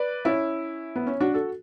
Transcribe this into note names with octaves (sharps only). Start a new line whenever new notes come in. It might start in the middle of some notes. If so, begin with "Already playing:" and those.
Already playing: B4 D5
C#4 E4
B3
C#4
D4 F#4
F#4 A4